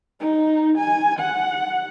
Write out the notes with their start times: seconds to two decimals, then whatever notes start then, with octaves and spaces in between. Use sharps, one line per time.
0.20 D#4
0.78 G#5
1.20 F#5